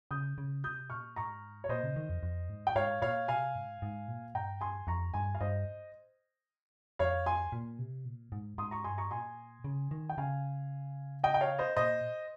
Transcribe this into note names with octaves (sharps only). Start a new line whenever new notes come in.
C#3 D#6 G6
C#3
C3 D#6 G6
A#2 C#6 F6
G#2 A#5 C#6
C#5
A#2 C5 D#5
C#3
D#3
F2
F2
G#2
G5
G#2 C#5 F5
A#2 C#5 F5
C3 F5 G#5
G#2
G#2
A#2
G2 G5 A#5
G#5 C6
F2 A#5 C#6
G2 G#5 C6
F5
G2 C5 D#5
F2 C#5 F5
G#5 C6
A#2
C3
A#2
G#2
G#2 C6 D#6
A#5 C#6
G2 G#5 C6
A#5 C#6
A#2 G#5 C6
C#3
D#3
G5
C#3 F5 G#5
D#5 G5
G5
C#5 F5
C5 D#5
A#2 C5 D#5